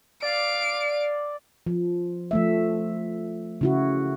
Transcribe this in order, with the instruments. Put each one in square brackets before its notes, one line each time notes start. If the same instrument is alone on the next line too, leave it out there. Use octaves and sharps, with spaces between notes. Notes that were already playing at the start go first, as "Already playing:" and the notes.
[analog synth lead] D5 [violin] F5 D7
[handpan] F3
F3 A3 E5
C#3 E4 F#4